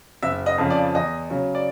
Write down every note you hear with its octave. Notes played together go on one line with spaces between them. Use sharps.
F#1 E5
D#5
F2 C#3 F3
D5
E2 D#5
C#3 F#3
D5